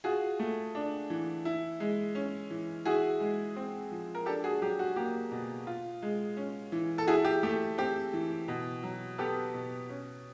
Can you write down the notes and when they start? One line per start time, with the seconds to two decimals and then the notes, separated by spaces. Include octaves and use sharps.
0.04 F4 F#4 G#4
0.39 A3
0.75 D4
1.10 E3
1.45 E4
1.80 G#3
2.15 C#4
2.50 E3
2.85 E4 F#4 G#4
3.20 G#3
3.56 C4
3.91 F3
4.15 A#4
4.26 D4 G4 A4
4.44 F#4 G#4
4.62 F#3 G4
4.79 F#4
4.96 A#3 G4
5.32 B2
5.67 F4
6.02 G#3
6.37 C#4
6.72 E3
6.98 A4
7.07 E4 F#4 G#4
7.25 G4
7.43 A3 G4
7.78 C4 G4
8.13 E3
8.48 B2
8.83 F#3
9.18 B3 G4 A4
9.54 B2
9.89 C#4